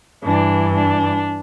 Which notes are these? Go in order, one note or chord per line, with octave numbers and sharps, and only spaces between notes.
G2 E3 D4
D4